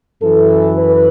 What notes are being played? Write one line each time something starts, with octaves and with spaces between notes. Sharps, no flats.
F#2 E3 A4
B4